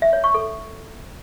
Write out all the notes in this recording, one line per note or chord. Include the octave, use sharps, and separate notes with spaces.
E5
C#5
C#6
A4